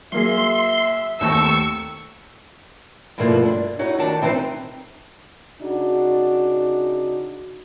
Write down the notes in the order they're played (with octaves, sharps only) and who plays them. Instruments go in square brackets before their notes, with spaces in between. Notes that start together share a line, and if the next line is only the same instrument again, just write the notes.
[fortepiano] F#3 A#3 G#4 [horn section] E5 [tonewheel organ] C6
[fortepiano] D#2 A3 G5 [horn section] C4 F#5 A#5 [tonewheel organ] C#6 [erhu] E6
[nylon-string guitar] G2 B2 F3 A3 A#3 E4
D4
D#4 E4 F#4 C#5
D#3 D4 A5
E3 C4 D#4 E4 B4 C5
[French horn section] C#3 D4 D#4 F#4